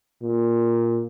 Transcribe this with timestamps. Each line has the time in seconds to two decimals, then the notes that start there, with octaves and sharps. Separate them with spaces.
0.22 A#2